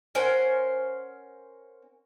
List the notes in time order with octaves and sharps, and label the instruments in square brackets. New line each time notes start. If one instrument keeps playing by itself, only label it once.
[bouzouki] C#4 A#4 C5 F#5